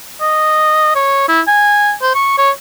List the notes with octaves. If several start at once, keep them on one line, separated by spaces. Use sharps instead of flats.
D#5
C#5
E4
G#5
C5
C#6
C#5